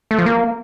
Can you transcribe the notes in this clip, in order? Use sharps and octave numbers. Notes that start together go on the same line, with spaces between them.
A3
F3
A#3